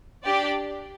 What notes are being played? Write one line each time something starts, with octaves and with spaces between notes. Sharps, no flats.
D4 G4 D5